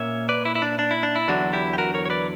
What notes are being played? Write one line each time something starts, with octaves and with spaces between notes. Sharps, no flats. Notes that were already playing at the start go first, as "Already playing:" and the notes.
Already playing: A#2 A#3 C#4 C#5 E5
B4 D5
E4
E4
D4
D4
E4
D4
E4
E2 D3 F#3 D4 F#4
E4 G4
G4
F#4 A#4
A#4 C#5
C#5
B4 D5